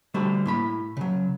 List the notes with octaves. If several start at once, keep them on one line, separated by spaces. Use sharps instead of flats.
D3 G3 A3 F#4 C5
A2 A#3 B5
C#3 F#3